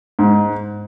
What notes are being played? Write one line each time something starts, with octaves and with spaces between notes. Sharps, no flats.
G#2